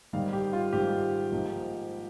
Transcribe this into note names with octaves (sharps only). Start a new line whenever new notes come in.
G#2 D#3 G3 F5
G4
F4
G#2 D#3 G3 G4
G#2 F3 A#3 D#4